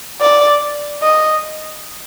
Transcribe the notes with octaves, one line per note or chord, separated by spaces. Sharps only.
D5
D#5